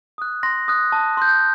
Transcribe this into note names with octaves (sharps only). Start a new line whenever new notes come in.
D#6 F#6
C6 A#6
D#6 F#6
A5
C6 G6